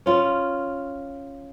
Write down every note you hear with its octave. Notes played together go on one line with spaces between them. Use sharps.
C#4 F4